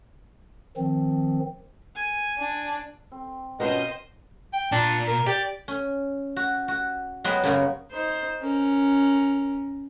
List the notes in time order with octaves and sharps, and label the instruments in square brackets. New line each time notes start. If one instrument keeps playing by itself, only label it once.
[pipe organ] D#3 F3 C4
[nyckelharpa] G#5
[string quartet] D4
[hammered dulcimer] C4
[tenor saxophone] B2 [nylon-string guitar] C#4 F4 A#4 [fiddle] C5 D#5
[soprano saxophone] G5
[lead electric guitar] A#2 [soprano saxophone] D4
[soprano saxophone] A#4
[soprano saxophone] G4 [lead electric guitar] D5
[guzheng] C#4
F#4
F#4
F#3 G#3 B3 G4 C5
F#2 C#3 A#3 B3 C#5
[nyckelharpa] D#4 C5
C#4 A#4